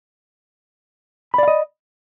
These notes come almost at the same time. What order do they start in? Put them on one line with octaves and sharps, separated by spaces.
B5 D5 F5 D#5